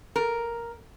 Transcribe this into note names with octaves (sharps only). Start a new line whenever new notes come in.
A#4